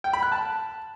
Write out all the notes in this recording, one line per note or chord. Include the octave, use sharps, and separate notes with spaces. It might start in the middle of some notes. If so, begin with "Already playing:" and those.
G5
B5
F#6
A5